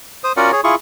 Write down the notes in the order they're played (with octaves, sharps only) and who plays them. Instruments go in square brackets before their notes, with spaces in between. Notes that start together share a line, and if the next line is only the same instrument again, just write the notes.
[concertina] C5 D#6
C#4 F4 F#4 A#4 D5 F#5
G#4 C#5
E4 F4 G#4 C#6